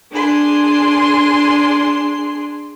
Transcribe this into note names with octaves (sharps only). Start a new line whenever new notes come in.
D4 G#4 C6